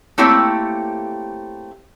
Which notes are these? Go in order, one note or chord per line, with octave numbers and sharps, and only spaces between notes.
A3 A#3 C4 E4 G4 C#5